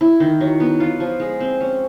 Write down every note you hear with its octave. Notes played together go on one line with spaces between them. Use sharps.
E4
D#3
F#3
B3
F4
F3
G#3
C4
C#4